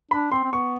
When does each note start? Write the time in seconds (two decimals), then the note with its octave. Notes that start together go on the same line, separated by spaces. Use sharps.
0.11 D4 B5
0.31 C4 C6
0.44 C4
0.52 B3 C#6